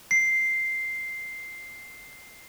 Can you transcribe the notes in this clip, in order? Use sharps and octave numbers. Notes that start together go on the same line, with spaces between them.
C7